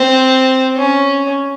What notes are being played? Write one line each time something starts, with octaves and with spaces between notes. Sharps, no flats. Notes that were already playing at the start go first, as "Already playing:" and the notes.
Already playing: C4
C#4